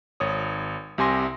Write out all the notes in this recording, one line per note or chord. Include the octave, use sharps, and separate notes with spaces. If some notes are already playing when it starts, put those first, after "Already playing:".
G#1 C#5 D#6
C2 C3 G#5 C6 A#6